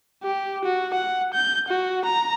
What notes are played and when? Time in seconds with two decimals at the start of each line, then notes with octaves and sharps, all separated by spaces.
0.23 G4
0.64 F#4
0.94 F#5
1.34 G6
1.68 F#4
2.05 A#5